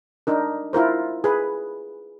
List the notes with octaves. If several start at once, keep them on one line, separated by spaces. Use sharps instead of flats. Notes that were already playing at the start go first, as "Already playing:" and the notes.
D4 D#4 A#4
E4 F4 A#4 C5
G#4 B4